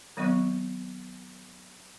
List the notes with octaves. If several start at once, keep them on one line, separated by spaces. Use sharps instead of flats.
D#3 F#3 B3 C4 D#5 C#6